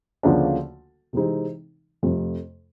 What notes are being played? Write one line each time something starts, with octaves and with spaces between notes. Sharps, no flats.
D2 C#3 F3 A#3 D4
C3 E3 G#3 C4 D#4
F2 C3 F3 A3